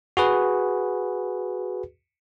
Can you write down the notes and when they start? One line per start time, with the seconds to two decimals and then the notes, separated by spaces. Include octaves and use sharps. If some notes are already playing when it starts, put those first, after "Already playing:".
0.17 F#4 G#4 B4